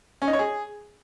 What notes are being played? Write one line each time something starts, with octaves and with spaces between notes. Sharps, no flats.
C#4
D#4
C#5
G#4